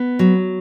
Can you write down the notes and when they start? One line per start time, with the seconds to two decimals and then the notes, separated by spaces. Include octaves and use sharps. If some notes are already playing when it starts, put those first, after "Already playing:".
Already playing: B3
0.19 F#3